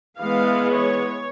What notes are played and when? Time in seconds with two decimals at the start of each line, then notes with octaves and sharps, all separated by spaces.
0.19 E3 G#3 B3 F5
0.72 C#5